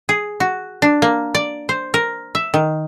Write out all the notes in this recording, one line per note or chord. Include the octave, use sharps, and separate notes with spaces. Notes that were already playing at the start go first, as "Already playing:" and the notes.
G#4
F#4
D4
A#3
D5
C5
A#4
E5
D#3